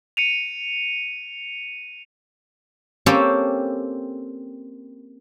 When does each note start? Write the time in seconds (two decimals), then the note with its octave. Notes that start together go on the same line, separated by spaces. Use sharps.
0.17 C#7 D#7 F7
3.06 A#3 C4 C#4 G4 A4 C5